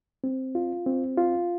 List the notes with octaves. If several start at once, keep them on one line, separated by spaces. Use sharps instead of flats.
C4
F4
C4
F4